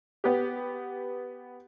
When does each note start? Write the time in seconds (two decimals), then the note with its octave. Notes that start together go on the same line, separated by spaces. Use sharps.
0.24 B3 G4